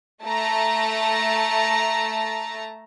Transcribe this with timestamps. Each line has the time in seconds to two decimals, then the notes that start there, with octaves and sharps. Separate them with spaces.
0.23 A3 A5 A#5